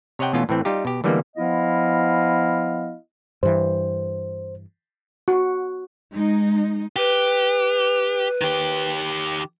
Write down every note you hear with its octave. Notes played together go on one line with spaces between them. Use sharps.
C3 C#5 D#5 F#5 G5
B2 E3 A3 B3 C#4 F4
A2 E3 C4
G3 D#4 F4 G4
B2 G4
D3 E3 G3 G#3 A#3 B3
F3 B3 E4 D#5 F5
G2 E3 C5
F#4
G#3 D#4
G4 B4
D#3 G4